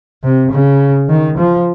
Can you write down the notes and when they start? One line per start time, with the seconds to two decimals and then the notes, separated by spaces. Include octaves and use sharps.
0.24 C3
0.51 C#3
1.09 D#3
1.38 F3